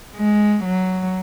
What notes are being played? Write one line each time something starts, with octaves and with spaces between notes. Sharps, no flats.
G#3
F#3